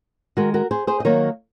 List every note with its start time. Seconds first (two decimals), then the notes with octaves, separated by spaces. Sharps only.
0.37 D#3 G#3 F#4 A#4
0.54 F#4 A#4
0.71 G#4 C5
0.87 G#4 C5
1.00 D#5
1.05 D#3 F#3 A#3 A#4 C#5